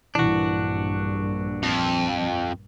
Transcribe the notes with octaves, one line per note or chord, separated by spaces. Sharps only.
A#1 G2 A#2 E3 D4 F#4
F2